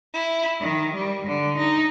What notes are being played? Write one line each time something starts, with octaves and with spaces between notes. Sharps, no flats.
E4
D#3
G3
D3
D#4